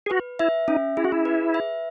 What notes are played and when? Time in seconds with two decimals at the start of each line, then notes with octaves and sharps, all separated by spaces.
0.06 G#4
0.10 F#4 B4
0.39 E4 E5
0.68 C#4 D#4
0.97 E4 G#4
1.04 F#4
1.12 E4
1.25 B4
1.54 E5